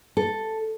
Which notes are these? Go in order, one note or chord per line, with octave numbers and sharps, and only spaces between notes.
A4